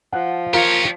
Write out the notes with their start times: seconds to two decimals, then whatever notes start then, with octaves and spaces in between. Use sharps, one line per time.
0.12 F3 F#5
0.54 F4 G4 A#4 C#5